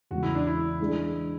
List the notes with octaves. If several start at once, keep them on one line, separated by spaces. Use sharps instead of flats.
E2 C#3 G#3 F#4
E4
D4
E4
E3 G#3 D4 G#4 D5